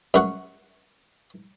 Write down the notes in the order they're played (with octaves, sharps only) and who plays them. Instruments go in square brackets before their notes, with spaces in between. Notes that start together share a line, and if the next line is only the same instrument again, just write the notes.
[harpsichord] F#2 F#4 F#5